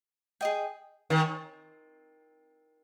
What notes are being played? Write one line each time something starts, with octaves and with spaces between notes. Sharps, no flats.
G#4 D#5 G5
D#3 C#5 G#5 C#6